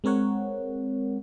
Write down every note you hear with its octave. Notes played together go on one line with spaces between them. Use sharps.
G#3 C4 A#4 C#5 F#5